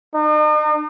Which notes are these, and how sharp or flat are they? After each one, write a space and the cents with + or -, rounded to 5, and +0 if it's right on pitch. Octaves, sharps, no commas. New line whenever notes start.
D#4 -45